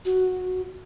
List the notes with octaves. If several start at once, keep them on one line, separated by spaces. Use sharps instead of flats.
F#4